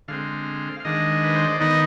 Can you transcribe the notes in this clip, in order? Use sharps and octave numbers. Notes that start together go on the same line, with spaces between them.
D3 G#3 C4 F5
F5
D#3 G#3 D4 D#5
B4
C5
D5
D#3 B3 D#4 D#5